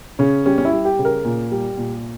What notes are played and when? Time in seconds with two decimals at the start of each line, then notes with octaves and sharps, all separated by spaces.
0.19 C#3 C#4
0.46 G3 C#4
0.58 C#4
0.65 E4
0.72 G3
0.85 G4
0.99 C#3
1.05 A#4
1.24 A#2
1.51 G3
1.77 A#2